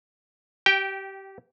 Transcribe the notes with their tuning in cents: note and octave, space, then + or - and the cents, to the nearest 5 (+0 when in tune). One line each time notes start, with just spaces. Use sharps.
G4 -20 G5 +0